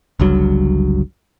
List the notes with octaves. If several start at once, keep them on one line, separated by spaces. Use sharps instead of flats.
G1 C#2 G2 F#3